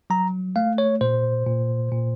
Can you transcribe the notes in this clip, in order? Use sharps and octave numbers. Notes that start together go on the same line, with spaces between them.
F#3 A#5
A3 F5
C#5
A#2 C5
A#2
A#2